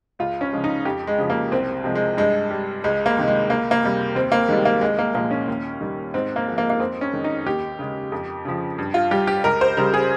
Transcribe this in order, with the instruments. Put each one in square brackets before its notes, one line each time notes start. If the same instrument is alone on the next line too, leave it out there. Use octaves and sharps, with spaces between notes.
[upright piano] C#2 F4
C#4
C#3 F3 G#3
D#4
F2 G4
G#3
C#3 F3 G#3
A#3
C2 C4
C3 F3 G#3
G#3
G2 G#3
G3
C#2 G#3
A#3
C3 D#3 G#3
G#3
C#2 A#3
A#3
C3 G3
D#2 C4
A#3
D#3 G3 G#3
A#3
C2 G#3
A#3
A#2 F3 G#3 A#3
C#4
D#2
D#3 G3
G#2 C4
A#3
F3 G#3
A#3
A#3
F2 C4
C#4
D#3 G#3
D#4
D#2 G4
C#3 G#3
F2
C#3 F3
G2
F4
G3 G4
G4
C#2 A#4
C5
C#3 G3 A#4
G#4